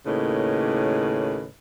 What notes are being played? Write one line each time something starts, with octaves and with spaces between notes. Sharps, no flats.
D#2 A2 C#3 A#3 B4 D#5